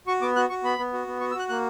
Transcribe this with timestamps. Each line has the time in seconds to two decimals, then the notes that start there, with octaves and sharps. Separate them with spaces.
0.07 F#4 C#6
0.22 B3 D6
0.36 F#4 F#6
0.50 F#4 C#6
0.63 B3 B5
0.78 B3
0.93 F#4
1.07 B3
1.20 F#4 C#6
1.31 E6
1.35 F#4 F#6
1.49 A#3 F#6